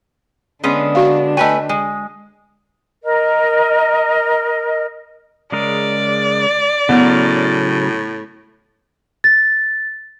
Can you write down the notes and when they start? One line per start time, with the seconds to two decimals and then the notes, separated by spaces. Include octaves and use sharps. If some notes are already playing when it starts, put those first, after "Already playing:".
0.64 D3 G#3 B3 C#4 D4
0.95 F#4 F5
1.37 A3 B4 D#5 G5 G#5
1.69 G#3
3.04 A#4 D#5
5.52 C#3 G#3 A#4 D5
6.89 A2 C#3 F#3 B3 A#4
9.24 A6